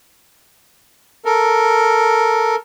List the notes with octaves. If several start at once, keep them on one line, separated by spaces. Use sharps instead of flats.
A4 A#4